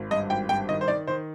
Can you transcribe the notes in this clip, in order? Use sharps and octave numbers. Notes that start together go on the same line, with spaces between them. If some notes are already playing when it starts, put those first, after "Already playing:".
Already playing: G#1
G2 D#5
G#1 G5
G2 G5
D#3 D#5
C5
D#3 D5
D#3 C5